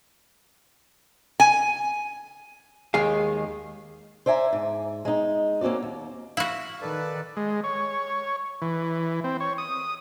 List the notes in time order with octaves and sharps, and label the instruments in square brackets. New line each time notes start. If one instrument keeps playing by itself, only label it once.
[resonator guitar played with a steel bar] G#5
[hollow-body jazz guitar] D#2 D#3 G#3 G#4 F5
[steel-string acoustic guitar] C5 D5 E5 G#5 A#5
G#2
G#3 D#4
A#3 C4 C#4 F#4 D5
D#2
[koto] E4 F#4 [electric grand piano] F5
[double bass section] D#3 [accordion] A4 B4 D5
[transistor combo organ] G#3
C#5
E3
C4
C#5
D#6